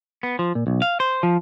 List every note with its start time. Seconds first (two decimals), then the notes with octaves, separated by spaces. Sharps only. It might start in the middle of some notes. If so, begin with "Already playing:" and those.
0.23 B3
0.39 F3
0.55 A#2
0.67 B1
0.82 F5
1.00 C5
1.23 F3